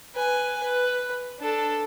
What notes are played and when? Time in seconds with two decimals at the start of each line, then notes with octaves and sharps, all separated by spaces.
0.15 B4 G#5
0.63 B4
1.40 D4 A4